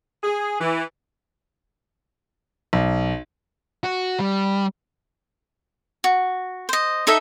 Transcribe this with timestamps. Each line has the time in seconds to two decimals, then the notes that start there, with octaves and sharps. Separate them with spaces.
0.23 G#4
0.60 E3
2.73 B1
3.84 F#4
4.20 G3
6.04 F#4
6.69 C5 D#5
7.07 D#4 A4 D#5 E5